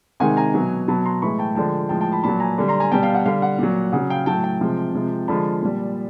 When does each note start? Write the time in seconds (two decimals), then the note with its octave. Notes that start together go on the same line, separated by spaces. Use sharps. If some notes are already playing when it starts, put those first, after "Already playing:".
0.20 C3 D#3 G#3 F#5 G#5
0.37 G#5 A#5
0.54 B2 F#3
0.88 B2 F#3 A5 B5
1.05 A#5 C6
1.22 A2 E3 G#3 B5 C#6
1.39 G5 A5
1.55 D3 F3 G#3 G5 A5
1.89 A2 F3 G#3 G5 A5
2.01 G5 A5
2.12 A5 B5
2.24 A#2 F#3 A5 B5
2.40 G#5 A#5
2.58 D3 G3
2.68 A#5 C6
2.80 G#5 A#5
2.92 B2 G3 G5 A5
3.03 F5 G5
3.15 F#5
3.26 D3 G3 F5
3.42 F#5
3.59 A#2 F#3
3.92 C#3 F#3 F#5
4.10 F5 G5
4.26 A2 F#3 G5 A5
4.44 G5 A5
4.61 C3 F3 G#3
4.94 C3 F3 G#3
5.28 D3 F3 G#3 A5 B5
5.62 A#2 G3